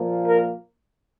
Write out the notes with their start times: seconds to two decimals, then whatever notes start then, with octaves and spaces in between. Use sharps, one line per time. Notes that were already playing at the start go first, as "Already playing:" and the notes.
Already playing: A#2 F3 A#3
0.27 A#4